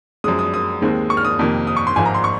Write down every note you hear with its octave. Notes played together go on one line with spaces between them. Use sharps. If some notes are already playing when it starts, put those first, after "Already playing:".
F#2 F3 G#3 D#6
D#6
D#6
D#2 D#3 G#3 C4
C#6
F6
D#6
F2 C3 D#3 A#3
D#6
C#6
C6
G#1 G#2 F3 G#5
A#5
C6
C#6